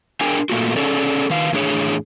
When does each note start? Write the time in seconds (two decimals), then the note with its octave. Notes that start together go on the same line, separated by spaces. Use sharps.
0.21 D4 G#4 A#4 G5 G#5
0.49 A#2 A3 A#3 F4 F#4
0.76 C#4 G#4 A4 D5
1.30 D#3 B4 F5
1.52 E2 A2 D4 G#4 C#5